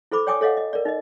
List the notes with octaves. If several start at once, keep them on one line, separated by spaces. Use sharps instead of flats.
E4 A4 C5 B5 D6
C#5 D5 G5 G#5 D6 D#6
A4 C#5 D#5 F5 F#5
D#5
A#4 D5
D#4 D#5